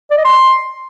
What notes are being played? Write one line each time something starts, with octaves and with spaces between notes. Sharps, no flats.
D5
D#5
C6